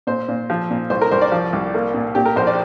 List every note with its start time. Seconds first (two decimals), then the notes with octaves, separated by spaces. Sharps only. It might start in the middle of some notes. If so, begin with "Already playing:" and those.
0.07 A#2 C5
0.29 A#2
0.50 F3
0.71 A#2
0.90 C2 C5
1.01 A#4
1.12 C2 C5
1.21 D5
1.32 F3
1.53 C2
1.75 A#3
1.94 A#2
2.15 A#2 G4
2.26 A#4
2.36 A#1 C5
2.47 D5